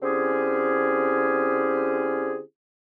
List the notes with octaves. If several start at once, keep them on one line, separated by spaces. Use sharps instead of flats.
D3 C4 C#4 E4 G4 G#4